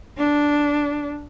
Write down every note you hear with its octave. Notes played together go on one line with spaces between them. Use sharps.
D4